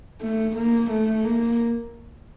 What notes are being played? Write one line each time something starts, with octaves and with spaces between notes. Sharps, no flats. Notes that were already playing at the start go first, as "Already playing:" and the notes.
A3
A#3
A3
A#3